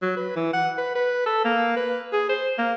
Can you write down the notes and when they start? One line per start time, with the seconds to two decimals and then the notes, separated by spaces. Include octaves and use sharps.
0.02 F#3
0.17 B4
0.36 E3
0.53 F#5
0.78 B4
0.95 B4
1.26 A4
1.45 A#3
1.76 B4
2.13 G#4
2.29 C5
2.58 A#3